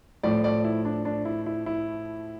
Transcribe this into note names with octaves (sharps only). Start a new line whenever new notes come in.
A2 F3 A3 D5
D5
E4
D4
D4
E4
E4
E4